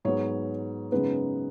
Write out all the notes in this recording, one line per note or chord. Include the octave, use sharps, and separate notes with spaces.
G#2 F#3 B3 C#5
F#2 C#3 G#3 B3 D#4 B4